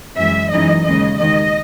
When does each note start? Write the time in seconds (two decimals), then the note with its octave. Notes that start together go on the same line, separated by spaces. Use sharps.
0.17 F#2 E3 G#3 E5
0.51 F#2 E3 G#3 D#4 D#5
0.85 D#2 C#3 G#3 D#5
1.20 D#2 D#3 G#3 D#5